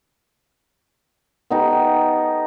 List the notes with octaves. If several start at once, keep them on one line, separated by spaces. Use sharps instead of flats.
B3 D#4 G4 A4